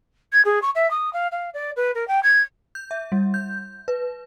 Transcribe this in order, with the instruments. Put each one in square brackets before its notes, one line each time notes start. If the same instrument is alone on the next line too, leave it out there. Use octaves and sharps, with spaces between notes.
[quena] G#6
G#4
C#6
E5
D#6
F5
F5
D5
B4
A#4
G5
G#6
[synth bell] G6
E5
G3
G6
B4